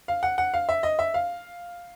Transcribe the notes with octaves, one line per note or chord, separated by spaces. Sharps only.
F5
F#5
F#5
F5
E5
D#5
E5
F5